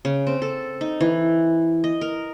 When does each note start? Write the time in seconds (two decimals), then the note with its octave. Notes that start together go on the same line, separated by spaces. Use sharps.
0.05 C#3
0.27 C4
0.42 A4
0.81 D#4
1.01 E3
1.84 D#5
2.01 A#4